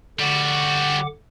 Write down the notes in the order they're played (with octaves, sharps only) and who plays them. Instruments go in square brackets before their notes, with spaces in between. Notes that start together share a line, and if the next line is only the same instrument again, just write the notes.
[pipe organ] D3 F#5 D6 [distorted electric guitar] G3 F#4